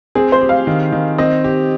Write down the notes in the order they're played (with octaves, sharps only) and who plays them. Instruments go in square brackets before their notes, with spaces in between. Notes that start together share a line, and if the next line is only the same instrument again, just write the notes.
[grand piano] C4 [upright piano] G#4
[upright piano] C5
[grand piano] G4
[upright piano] F5
[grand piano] D#3
D#3
[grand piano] C4 [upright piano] D#5
[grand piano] G4